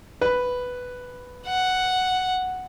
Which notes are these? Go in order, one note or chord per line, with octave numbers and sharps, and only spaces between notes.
B4
F#5